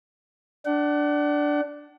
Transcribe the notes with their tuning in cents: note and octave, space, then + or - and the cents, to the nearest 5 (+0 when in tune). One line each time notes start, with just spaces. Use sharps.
D4 +0 F#5 +35